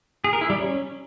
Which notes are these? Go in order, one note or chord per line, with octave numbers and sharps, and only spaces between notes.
G#4
A#4
E4
G3
C#4